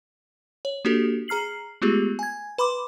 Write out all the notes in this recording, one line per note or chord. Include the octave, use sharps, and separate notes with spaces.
C#5
A#3 D4 F#4 G4 A4
G#4 A#5 F6 C7 F#7
G#3 A3 B3 F4 G4 G#4
G#5 G#6
B4 B5 C6 D6